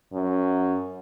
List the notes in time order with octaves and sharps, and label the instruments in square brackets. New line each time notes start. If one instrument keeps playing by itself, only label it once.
[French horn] F#2